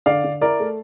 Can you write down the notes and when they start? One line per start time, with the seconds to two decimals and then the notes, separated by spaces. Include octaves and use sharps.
0.06 D3 D5 F5
0.24 D3
0.41 E4 A#4 D5
0.60 A3